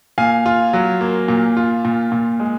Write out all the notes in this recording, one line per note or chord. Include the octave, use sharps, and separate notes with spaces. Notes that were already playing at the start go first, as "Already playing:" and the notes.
A#2 F5 G#5
F4
F#3
A#3
A#2
F4
A#2
A#2
G#3